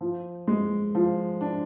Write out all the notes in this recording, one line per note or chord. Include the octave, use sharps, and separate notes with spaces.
F3
G#3
F3
D4